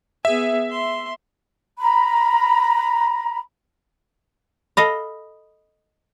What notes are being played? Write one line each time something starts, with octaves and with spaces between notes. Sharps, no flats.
B3 G#4 E5
C6
A#5 B5
A4 D#5 F5 B5 A#6